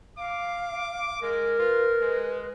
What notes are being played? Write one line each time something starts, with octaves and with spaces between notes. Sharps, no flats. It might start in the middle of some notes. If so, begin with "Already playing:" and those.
F5 D6
G#3 A#4
F4 B4
G#3